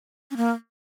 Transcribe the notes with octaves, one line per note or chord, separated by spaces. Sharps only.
C#4
A#3